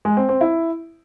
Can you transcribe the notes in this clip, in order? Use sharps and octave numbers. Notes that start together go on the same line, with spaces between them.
G#3
C4
C4
E4